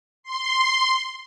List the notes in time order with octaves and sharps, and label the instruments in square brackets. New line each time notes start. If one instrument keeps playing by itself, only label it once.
[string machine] C6